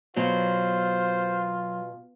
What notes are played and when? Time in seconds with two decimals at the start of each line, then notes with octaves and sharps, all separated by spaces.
0.17 B2 F#3 F4 C5